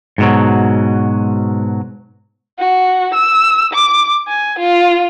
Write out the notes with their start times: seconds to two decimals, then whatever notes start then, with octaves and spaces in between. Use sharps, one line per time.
0.18 G#2 B2 F#3
2.58 F#4
3.14 E6
3.73 D6
4.28 G#5
4.59 F4